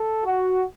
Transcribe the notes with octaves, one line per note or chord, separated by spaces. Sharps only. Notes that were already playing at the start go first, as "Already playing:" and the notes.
Already playing: A4
F#4